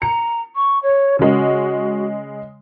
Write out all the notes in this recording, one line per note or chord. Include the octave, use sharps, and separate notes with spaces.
A#5 C#7
C#6
C#5
C#3 G#3 F#4